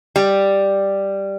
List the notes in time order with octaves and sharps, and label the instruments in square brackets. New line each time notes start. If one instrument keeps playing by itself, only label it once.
[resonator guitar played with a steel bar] G3